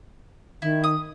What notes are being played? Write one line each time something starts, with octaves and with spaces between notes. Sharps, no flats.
D#3 E4
D#6